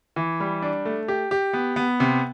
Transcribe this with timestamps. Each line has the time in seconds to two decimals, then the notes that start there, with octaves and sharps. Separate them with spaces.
0.16 E3
0.40 G3
0.62 D4
0.85 A3
1.08 G4
1.31 G4
1.53 B3
1.76 B3
2.00 C3